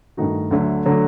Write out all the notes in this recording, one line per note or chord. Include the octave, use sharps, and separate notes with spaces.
G2 D#3 A3 D#4 F#4
D2 D3 F#3 A3
D3 F#3 A3